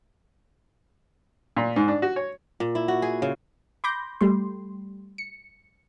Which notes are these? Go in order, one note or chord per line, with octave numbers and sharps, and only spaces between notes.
A#2
G#2
D4
F#4
C#5
A#2
E4
F#4
G#4
C#3
B5 C6 D6 G6 A#6
G3 A3 C6
C#7